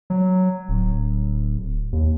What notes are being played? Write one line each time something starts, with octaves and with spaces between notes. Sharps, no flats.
F#3
D1
D#2